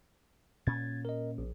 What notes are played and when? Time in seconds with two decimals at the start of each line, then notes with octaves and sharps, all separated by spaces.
0.67 A#2 C#4 G#6 A6
1.05 A#4 D#5
1.38 A#1